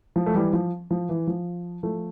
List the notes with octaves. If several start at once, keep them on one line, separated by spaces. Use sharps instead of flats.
F3
A3
E3 G3
F3
F3
E3
F3
F3 A3